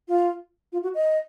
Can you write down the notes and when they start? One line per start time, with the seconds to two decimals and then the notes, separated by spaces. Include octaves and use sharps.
0.08 F4
0.73 F4
0.83 F#4
0.94 D#5